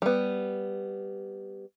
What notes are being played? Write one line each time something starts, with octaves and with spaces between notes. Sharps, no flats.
G3 B3